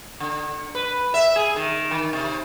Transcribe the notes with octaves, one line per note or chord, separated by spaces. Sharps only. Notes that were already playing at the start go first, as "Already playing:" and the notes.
D3
B4
E5
G#4
D#3
D#3
C3